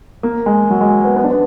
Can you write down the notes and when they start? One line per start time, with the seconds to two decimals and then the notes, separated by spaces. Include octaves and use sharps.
0.23 A#3
0.46 G#3
0.70 F#3
0.81 G#3
1.04 B3
1.16 B3
1.24 D4
1.31 B3